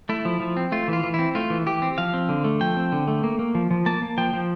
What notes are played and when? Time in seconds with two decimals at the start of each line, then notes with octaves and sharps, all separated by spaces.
0.09 A3 E4
0.25 F3
0.40 F3
0.57 C4
0.72 A3 F4
0.88 E3 F4
1.04 E3
1.14 C4 E4
1.35 A3 F4
1.50 E3
1.66 E3 G4
1.82 C4
1.98 F3 F5
2.14 C4
2.29 D3
2.44 A3
2.61 F3 G5
2.77 C4
2.92 D3
3.08 A3
3.24 A#3
3.39 A#3
3.55 F3
3.71 F3
3.86 A#3 A5
4.02 A#3
4.18 F3 G5
4.33 F3